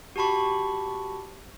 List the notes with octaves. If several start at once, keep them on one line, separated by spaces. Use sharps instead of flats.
F#4 G4 A5 B5 C#6